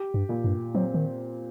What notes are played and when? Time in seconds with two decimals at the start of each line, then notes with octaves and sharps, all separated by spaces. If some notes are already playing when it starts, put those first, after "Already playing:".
Already playing: G4
0.14 G2
0.29 A#2
0.44 G2
0.75 F#3 C4
0.94 D#3